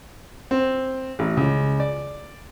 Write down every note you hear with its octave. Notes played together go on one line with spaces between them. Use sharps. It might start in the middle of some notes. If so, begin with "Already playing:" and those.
C4
A1
C#2
D5